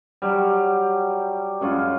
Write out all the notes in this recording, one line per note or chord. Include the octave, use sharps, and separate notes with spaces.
F#3 G3
F#2 G#3 C#4 F4